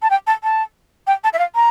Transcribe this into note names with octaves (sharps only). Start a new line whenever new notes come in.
A5
G5
A5
A5
G5
A5
E5
F5
A#5